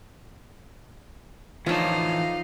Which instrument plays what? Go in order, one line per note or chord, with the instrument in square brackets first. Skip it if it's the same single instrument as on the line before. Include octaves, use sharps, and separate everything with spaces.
[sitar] D3 F4 [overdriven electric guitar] E3 A5 [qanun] F3 C#5 [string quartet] D#4 F5